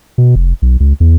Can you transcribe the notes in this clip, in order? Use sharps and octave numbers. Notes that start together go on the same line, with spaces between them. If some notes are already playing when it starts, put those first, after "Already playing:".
B2
F1
B1
C#2
E2